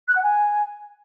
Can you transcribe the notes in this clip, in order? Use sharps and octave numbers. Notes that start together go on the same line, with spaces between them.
F#6
F#5
G#5